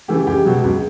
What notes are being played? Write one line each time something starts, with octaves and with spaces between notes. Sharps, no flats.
C#3 E3 A3 G4
C#2 G4
B2 F#3
C#2